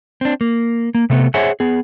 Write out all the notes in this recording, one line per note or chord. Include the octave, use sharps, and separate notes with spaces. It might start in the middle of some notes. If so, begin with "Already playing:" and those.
C4 D4
A#3
A#3
C3 A3 B3
G#4 C5 C#5 E5 F#5 G#5
B3 G#4